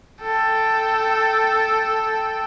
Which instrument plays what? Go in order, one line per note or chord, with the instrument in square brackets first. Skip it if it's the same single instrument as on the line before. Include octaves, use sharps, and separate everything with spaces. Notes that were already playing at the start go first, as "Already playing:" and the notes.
[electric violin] A4 G5